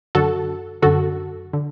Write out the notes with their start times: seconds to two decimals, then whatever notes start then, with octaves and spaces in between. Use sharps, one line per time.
0.15 F#2 D3 F#4 A4
0.82 F#2 D3 F#4 A4
1.53 D3